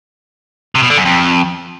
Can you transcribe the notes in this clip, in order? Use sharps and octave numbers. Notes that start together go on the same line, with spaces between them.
C3
B2
D3
F#2
F2